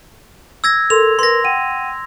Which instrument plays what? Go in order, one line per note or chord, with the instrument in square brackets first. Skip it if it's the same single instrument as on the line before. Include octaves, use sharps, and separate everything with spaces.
[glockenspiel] E6 G#6 A#6
[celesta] A4 A#4 C6 [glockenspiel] F7
[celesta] A#4 B4 [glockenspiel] C6 A#6
[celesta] F#5 G5 D#7